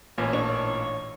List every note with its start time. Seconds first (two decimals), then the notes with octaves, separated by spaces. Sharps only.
0.18 A1 A#2 A#3 C#4 B4
0.33 D4 C#5